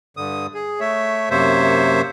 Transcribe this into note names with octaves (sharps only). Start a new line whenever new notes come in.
G2 D3 D#6
G#4
A3 C#5 E5
F#2 C3 A#3 C5 C#5 E5